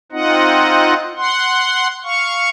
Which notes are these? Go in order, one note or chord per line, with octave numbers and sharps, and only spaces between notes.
C4 D#4 F4 D#5 F#5
F#5 C6
F5 C#6